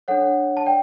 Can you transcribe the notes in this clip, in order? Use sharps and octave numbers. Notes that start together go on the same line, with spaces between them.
D4 A4 C#5 F#5
A5
D5 G5